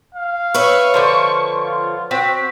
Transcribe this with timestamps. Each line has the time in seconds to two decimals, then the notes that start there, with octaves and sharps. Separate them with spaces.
0.15 F5
0.54 B4 C#5 E5 C#6
0.94 D3 F3 C5
1.64 F4
2.11 C4 F#4 B6